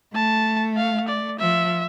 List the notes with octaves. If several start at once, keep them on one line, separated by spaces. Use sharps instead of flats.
A3 A5
F5
D5
F3 E5